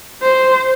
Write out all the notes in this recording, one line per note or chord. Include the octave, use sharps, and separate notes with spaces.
C5